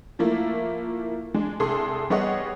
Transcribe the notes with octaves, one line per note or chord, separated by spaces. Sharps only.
F3 A3 A#3 E4
G#3 D4
C2 G#4 A4 C6
G3 B3 G#4 C#5 D#5 F#5